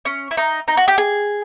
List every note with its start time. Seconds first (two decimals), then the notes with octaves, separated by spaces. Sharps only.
0.05 C#4
0.31 E4
0.37 D#4
0.68 D#4
0.77 F#4
0.88 G4
0.98 G#4